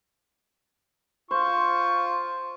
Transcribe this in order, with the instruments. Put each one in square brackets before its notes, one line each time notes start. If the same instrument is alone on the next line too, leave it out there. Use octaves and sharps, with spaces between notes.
[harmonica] F4 C#6 [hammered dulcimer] C5